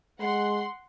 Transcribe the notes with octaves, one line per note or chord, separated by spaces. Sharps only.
G#3 F#5 C6